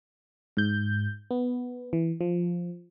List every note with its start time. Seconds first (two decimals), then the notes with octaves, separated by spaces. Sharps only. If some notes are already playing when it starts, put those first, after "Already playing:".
0.57 G#2 G6
1.31 B3
1.93 E3
2.21 F3